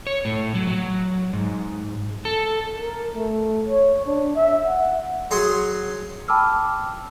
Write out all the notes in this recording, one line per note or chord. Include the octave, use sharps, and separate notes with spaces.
C#5
A2
F#3
F#3
G#2
A4
A#4
A3
C#5
D4
E5
F#5
F#3 G#4 G#5 C6
G5 A5 B5 D6 E6 F6